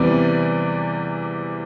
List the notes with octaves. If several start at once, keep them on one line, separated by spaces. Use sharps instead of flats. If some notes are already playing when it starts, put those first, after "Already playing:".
Already playing: E2 C3 E3 G3 D5